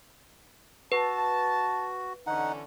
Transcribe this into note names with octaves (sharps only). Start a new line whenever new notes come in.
F#4 B4 A5
D3 E3 C#4 D#4 F#5